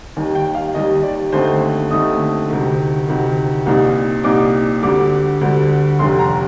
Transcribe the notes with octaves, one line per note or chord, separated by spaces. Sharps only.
D#2 D#3 G3
G5
F5
D#2 D#3 G3 D#5
D5
D#2 D3 A3 C4 D#4 C5
D#2 D3 A3 C4 D#4 D#6
D2 C3 D#3
D2 C3 D#3
C2 A#2 G3 C4 D#4
C2 A#2 G3 C4 D#4 D6
D2 D3 G3 D6
D2 D3 G3
F1 D#2 D3 G3 C6
A#5